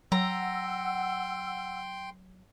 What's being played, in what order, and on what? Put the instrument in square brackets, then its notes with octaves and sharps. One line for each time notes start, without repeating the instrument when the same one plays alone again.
[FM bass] F#3 [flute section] F#5 E6 [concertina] G5 C6 [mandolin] A#5